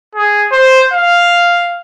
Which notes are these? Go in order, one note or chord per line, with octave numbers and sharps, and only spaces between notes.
G#4
C5
F5